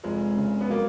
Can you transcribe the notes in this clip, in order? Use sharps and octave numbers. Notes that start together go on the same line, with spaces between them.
F1 F3 G#3
C#3
B3
F#3 A#3